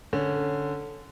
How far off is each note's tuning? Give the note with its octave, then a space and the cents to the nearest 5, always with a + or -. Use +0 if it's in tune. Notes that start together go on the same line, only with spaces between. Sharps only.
D3 +0 C#4 +0